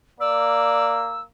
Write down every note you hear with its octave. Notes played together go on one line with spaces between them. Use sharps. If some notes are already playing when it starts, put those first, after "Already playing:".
A#3 D5 E6